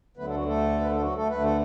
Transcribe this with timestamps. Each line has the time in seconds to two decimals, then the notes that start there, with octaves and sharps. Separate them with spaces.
0.17 D2 D3 F#3 A3 B3 B4
0.27 A3 A4
0.35 F#3 F#4
0.45 A3 A4
0.81 B4
0.91 A4
1.01 F#3 F#4
1.15 A3 A4
1.29 D2 D3 A3 B4
1.43 A4